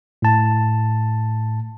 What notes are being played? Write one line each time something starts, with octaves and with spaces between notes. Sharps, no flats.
A2 A5